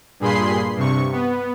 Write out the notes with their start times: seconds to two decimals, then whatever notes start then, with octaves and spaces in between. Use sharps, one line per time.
0.20 G2 A#2 G#4 B5 C6 C7
0.76 G2 C3 C#6
1.12 B3